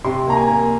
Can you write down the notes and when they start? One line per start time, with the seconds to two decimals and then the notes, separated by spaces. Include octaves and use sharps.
0.04 C3 C6
0.27 A#3 A#5
0.37 G#5
0.48 A#3